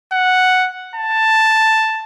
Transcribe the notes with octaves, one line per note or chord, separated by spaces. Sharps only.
F#5
A5